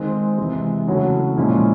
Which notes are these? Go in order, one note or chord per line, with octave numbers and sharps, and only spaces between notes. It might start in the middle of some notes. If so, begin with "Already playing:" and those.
Already playing: D#3 G#3 C4
C3 E3 G#3
C#3 F#3 A3 C#4 E4
A#2 F3 G#3 C#4 E4